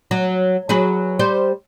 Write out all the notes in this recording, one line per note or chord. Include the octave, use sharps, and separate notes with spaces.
F#3
F#3 G#4 B4
G3 C5